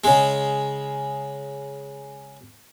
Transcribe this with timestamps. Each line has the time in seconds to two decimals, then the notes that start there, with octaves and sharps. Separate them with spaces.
0.04 C#3 G#3